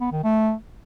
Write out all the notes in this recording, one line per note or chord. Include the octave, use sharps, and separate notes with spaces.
B3
D#3
A3